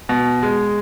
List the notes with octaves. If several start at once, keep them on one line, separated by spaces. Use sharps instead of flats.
B2
G#3